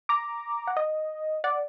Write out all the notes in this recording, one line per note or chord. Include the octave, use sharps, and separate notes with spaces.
A#5 D6
F#5
D#5
D5 F#5